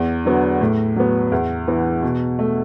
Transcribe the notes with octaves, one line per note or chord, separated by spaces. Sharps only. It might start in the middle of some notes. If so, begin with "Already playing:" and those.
Already playing: E2
D3 F#3 B3
A2
F#3 B3
E2
E3 B3
B2
A3